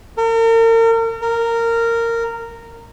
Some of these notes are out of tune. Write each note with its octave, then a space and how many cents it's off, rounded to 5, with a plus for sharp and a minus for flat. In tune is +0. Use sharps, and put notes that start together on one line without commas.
A#4 -40
A#4 -15